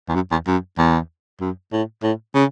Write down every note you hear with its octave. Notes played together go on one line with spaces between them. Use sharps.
E2
F#2
E2
F#2
E2
F#2
A2
A2
C#3